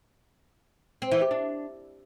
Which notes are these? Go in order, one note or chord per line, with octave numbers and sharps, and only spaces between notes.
C4
E3
G4
D4